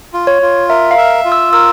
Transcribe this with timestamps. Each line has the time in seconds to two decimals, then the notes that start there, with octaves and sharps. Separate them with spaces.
0.13 F4
0.27 C#5
0.42 F4
0.69 A#4 E5
0.91 F5
0.98 E5
1.25 F4
1.32 E6
1.53 A#4 E6